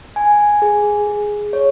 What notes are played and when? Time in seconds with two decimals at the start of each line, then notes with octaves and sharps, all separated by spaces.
0.16 G#5
0.62 G#4
1.07 G#4
1.53 C#5